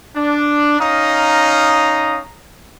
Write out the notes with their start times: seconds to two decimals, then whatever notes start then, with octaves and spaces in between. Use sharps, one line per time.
0.16 D4
0.80 C#4 D#4 F5 A#5 D#6